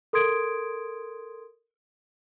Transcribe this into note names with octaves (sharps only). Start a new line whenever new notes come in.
A4 A#4 C6 D#6 G#6 D7